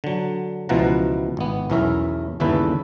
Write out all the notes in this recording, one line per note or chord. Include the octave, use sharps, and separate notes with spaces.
D3 F#3
C#2 B2 E3 F3 F#5 A#5
G#1 B3
B1 E2 E3 C#4 A#4 E5
G1 D#2 C#3 E3 A4 B4